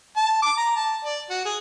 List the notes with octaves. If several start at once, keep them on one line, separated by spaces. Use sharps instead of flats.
A5
D6
A#5
A5
D5
F#4
G#4